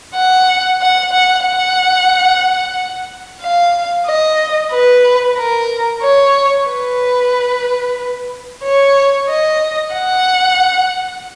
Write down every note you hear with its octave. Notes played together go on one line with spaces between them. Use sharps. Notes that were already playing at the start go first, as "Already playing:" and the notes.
F#5
F#5
F#5
F#5
F5
D#5
B4
A#4
C#5
B4
C#5
D#5
F#5